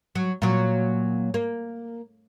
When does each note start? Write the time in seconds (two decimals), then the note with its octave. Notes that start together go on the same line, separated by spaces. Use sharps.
0.15 F#3
0.42 A#2 F#3
1.34 A#3